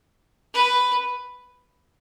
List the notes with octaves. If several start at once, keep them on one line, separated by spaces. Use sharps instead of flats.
B4